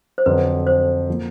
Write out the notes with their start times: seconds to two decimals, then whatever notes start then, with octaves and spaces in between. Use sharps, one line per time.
0.18 C5
0.26 F2 D3 F#3 B4
0.67 C5
1.10 F3 A#3